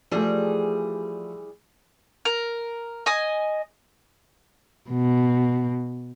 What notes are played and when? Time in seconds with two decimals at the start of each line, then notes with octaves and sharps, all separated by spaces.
0.12 E3 F3 G3 A3 G#4
2.25 A#4
3.06 D#5 G#5 D#6
4.90 B2